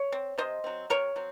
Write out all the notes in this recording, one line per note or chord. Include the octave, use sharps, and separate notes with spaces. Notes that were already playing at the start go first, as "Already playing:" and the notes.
Already playing: C#5
C4
C3 C5 D#5
F#3 C4
C3 A#4 C#5
F#3 C4